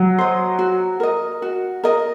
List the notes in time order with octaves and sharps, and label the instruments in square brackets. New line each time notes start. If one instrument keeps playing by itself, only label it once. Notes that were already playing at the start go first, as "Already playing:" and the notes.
Already playing: [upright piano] F#3
[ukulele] C5 D#5
F#4
A#4 D#5
F#4
A#4 D#5